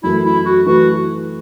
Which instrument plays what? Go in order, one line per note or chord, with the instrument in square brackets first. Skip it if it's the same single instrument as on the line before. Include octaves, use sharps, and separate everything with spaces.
[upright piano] F#2 E3 A3 [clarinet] E4
[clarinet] E4
F#4
[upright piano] E3 A3 E4 B4 [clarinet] F#4